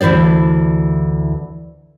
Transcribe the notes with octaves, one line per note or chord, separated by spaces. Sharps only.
D2 E3 E4 C5 D5